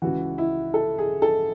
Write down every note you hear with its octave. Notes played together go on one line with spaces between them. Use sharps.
C#2 C#3 E3 F#4
E4
A4
G#4
A4